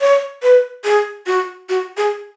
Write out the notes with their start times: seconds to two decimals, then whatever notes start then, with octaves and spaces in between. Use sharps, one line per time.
0.01 C#5
0.43 B4
0.85 G#4
1.27 F#4
1.69 F#4
1.97 G#4